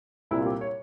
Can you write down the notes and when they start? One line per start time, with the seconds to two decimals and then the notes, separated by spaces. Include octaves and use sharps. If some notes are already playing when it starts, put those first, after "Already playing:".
0.31 C2 A#2 G3 C4 E4
0.41 F4
0.46 G4
0.61 C#5